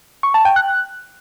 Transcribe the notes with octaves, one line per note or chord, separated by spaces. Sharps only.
C#6
A5
G5
F#6